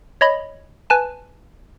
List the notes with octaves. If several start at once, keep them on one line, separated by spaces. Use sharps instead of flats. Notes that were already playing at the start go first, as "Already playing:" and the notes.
C#5 D#5 B5
B4 G#5 A5